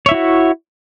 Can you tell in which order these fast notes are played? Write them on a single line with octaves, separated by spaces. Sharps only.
C#5 E5 E4 F#4